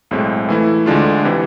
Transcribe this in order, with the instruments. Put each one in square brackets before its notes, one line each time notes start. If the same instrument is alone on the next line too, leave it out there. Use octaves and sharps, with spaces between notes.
[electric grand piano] B1 A2 G#3 C4
E3 A3 E4
D2 D3 G#3 D4 F4
C3 E3